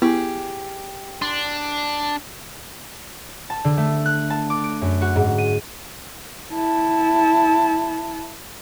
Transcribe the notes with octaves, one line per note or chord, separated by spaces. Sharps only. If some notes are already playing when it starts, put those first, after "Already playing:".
B3 E4 G4 G#4
D4 C6
A5
D3
A3
F#6
A5
D6
D7
F#2
F#4
G#2
D#7
E4 A5